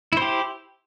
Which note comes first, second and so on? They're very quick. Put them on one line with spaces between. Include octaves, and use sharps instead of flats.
E4 C5 G4